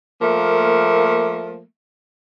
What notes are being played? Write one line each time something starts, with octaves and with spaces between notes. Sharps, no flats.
F3 A3 A#3